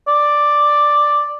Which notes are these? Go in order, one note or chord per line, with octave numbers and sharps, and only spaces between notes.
D5